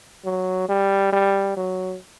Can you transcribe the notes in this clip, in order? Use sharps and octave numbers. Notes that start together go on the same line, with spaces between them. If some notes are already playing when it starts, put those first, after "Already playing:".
F#3
G3
G3
F#3